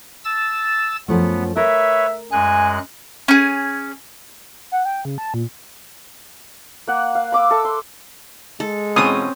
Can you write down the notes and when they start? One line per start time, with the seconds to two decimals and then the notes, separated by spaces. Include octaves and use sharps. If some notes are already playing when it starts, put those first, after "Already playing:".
0.24 A5 E6 A6
1.08 F#2 F3 A3 B3
1.57 A#4 B4 C#5 E5
2.32 F#2 G#3 G#5 F#6
3.28 C#4 G#4
4.72 F#5
4.85 G5
5.05 C#3
5.18 A5
5.34 A#2
6.87 A#3 F#5
7.15 F5
7.32 B5 D6 E6
7.51 A4 E5 E6
7.65 C6
8.60 G#3 A4
8.96 B2 E3 C4 C#4 F4 D#6